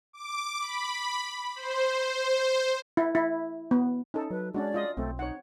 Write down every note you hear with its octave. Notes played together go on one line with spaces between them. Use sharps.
D6
B5
C5
E4
E4
B3
C#4 D#4 A4
F#3 B4
G#3 C#4 D4 F#4 D5
F4 D#5
B1 A3 C4
D#4 C#5 F#5